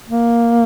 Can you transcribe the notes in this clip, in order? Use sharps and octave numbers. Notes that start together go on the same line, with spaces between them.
A#3